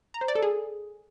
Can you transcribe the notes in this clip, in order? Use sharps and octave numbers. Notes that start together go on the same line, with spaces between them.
A#5
C5
D5
A4
G#4